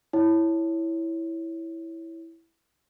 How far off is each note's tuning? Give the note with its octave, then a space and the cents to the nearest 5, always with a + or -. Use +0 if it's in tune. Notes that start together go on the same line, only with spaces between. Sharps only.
E4 +0 C#5 +0